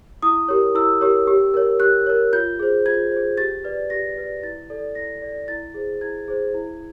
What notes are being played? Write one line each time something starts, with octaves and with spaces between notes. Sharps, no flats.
E4 D#6
G4 A#4 C#5
E4 E6
G4 A#4 C#5
G4
A#4 C#5
G4 F#6
A#4 C#5
F4 G6
G#4 C5
F4 G#6
G#4 C5
G4 A6
B4 D5
G4 A#6
B4 D5
E4 A6
A4 D5
E4 A#6
A4 D5
E4 A6
G#4 C5
E4 G#6
G#4 C5
E4